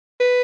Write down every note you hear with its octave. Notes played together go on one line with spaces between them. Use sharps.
B4